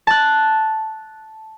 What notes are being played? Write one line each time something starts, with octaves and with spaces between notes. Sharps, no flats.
A5 F#6